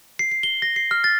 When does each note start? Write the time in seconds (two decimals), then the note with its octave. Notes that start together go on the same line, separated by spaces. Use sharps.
0.19 C7
0.31 C7
0.43 G7
0.62 A#6
0.76 C7
0.91 F6
1.04 A6